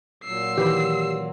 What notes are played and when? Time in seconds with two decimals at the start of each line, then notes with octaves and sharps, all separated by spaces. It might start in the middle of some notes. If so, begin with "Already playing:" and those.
0.25 A#2 F#3 E6 C7
0.58 D#3 E3 G4 B4 B5